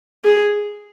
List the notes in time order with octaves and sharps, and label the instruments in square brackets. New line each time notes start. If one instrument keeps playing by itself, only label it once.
[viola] G#4